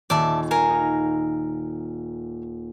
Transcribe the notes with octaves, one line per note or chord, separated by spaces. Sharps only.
D#1 D5 E5 A5 G#6
A#4 F5 G#5
D#4